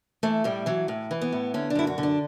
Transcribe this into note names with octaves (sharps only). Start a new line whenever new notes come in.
E3 A3
A2 G3
E3 F#3
A2
E3
B3
A2
D3 C#4
D4
F#2 E4
F#4
D3
D4